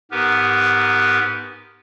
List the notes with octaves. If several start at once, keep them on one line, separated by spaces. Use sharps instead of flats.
G#2 B3 G4 A#4 B4